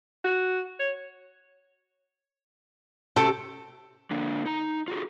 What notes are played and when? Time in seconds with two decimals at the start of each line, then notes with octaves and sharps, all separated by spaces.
0.24 F#4
0.80 C#5
3.16 C3 A3 C#4 F#4 A4 G5 A5
4.11 D3 A#3 D4
4.46 D#4 A#5
4.88 F4 F#4 G#4